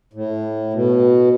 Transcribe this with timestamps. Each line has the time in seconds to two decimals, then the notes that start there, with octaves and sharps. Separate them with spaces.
0.13 A2
0.73 B2